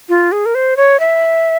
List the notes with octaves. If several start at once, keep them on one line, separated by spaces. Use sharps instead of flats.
F4
G#4
A#4
C5
C#5
E5